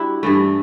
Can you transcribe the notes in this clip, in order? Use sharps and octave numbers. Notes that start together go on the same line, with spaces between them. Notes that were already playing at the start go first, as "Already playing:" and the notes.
Already playing: G3 D4 E4 F#4
G2 E3 A3